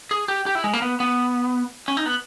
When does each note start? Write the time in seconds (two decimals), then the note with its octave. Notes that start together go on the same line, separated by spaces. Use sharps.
0.11 G#4
0.28 G4
0.46 G4
0.55 E4
0.64 G#3
0.73 A#3
0.82 B3
1.00 B3
1.88 C#4
1.97 D#4
2.06 B3